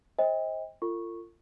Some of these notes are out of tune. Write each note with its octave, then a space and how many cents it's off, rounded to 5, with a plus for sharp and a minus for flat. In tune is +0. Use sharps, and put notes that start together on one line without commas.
C5 +20 D#5 +35 G5 +35
F4 -25 A4 +45 C#6 -10